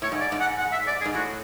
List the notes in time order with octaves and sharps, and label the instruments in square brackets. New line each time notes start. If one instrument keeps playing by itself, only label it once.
[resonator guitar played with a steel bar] A2 [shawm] C#5
[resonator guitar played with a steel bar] G#2
[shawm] D5
[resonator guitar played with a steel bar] G#2
[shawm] F#5
F#5
E5
D5
G#4
[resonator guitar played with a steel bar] G#2
[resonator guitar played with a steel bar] A2 [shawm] F#4